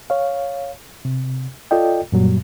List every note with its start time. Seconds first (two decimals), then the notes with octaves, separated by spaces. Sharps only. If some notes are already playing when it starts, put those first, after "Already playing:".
0.10 C#5 F5
1.05 C3
1.71 F4 A4 D5 D#5 G5
2.12 F#2 A#2 F#3 G3